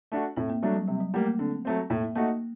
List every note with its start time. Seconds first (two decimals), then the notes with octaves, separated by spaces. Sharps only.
0.12 A3 D4 F#4
0.37 A2 C4
0.50 A#3
0.63 F#3 G3 A3 D4
0.75 F#3
0.88 C3 G3
1.00 F#3
1.14 G3 A3 A#3
1.26 A#3
1.39 D3 C4
1.65 F#3 A3 C4
1.90 A2 A#3
2.15 A3 A#3 D#4 F#4